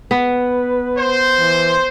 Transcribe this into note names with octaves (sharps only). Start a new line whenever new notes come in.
B3 B4
C5
E3